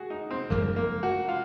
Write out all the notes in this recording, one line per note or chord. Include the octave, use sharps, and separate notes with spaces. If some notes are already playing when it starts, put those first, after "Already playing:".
Already playing: F#4 G#4
D#4
C4
F#1 F#2 F3 G#3 A#3
A#3
F#4
F4